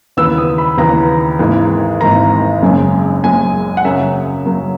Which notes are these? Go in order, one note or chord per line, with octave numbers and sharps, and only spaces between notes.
D#2 C#3 E3 B3 E6
D#6
B5
D#2 C#3 E3 B3 A#5
G#1 G#2 E3 A#3
G#1 G#2 E3 A#3 A#5
F#1 F#2 C#3 G#3
F#1 F#2 C#3 G#3 G#5
F#5
F#2 C#3 F#3 A#3 E5
F#2 C#3 F#3 A#3